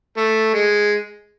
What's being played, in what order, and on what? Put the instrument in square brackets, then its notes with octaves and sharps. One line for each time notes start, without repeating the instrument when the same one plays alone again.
[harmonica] A3
G#3